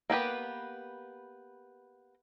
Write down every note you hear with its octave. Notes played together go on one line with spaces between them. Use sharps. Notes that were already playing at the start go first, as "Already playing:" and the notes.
A#3 B3 G4 B4